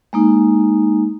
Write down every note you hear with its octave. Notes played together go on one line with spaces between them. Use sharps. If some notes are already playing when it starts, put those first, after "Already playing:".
G#3 A#3 D#4